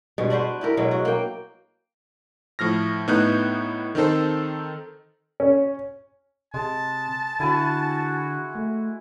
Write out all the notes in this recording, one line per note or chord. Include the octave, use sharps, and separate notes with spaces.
G2 B2 G#3
D4 F#4 B4 C5
E4 G4 A#4
B2 F#3 G#3
F#4
A#3 G5
A2 F3 F6 A#6
A2 B3 D#4 F#6 G6
D#3 C4 D#4 A4 C5
C#4
C3 G#3 A5
D3 E4 F#4 G#5 B5
A3